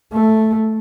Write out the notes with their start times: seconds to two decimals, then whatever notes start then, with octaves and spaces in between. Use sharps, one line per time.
0.13 A3